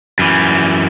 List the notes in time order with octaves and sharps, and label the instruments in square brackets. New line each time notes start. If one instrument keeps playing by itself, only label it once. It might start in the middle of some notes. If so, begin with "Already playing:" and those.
[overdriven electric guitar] F#2 E3